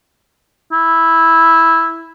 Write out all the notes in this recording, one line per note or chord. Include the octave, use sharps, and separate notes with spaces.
E4